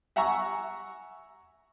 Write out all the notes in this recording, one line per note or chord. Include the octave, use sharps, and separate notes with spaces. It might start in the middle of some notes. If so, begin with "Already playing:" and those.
E5 F#5 G#5 A#5 C#6 E6